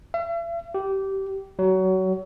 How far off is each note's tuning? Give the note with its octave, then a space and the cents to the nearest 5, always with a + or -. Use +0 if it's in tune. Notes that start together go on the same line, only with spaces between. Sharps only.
E5 +45
G4 -20
F#3 +25